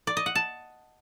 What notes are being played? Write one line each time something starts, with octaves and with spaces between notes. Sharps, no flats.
D5
D#5
F#5
A5